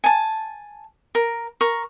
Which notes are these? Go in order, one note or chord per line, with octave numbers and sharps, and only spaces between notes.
G#5 A5
A#4
A#4 C#6